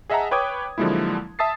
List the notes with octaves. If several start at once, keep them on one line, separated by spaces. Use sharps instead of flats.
G#4 D#5 E5 F#5 A5 A#5
B4 C#5 G5 D6 D#6 G#6
D3 F3 F#3 G#3 A#3 E4
E5 A5 D#6 A6 C7